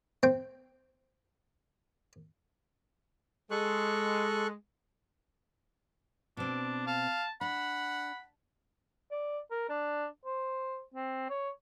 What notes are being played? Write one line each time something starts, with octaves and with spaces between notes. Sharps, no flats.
C4 G5
G#3 A4 C#6 F#6
B2 C4 D4
F5 A5
D4 F#5 B5
D5
A#4
D4
C5
C4
C#5